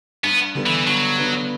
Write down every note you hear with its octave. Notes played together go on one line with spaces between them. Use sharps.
G2 B3
D3 G3 B3
E3
G2 F#3
D3 G3 B3